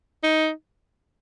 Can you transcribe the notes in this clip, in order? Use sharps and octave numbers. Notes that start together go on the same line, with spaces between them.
D#4